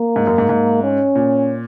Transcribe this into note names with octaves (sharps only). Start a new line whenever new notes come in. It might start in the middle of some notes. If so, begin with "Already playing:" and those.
Already playing: A#3
G#2
F#2
G#2
G#2
C#4
A#2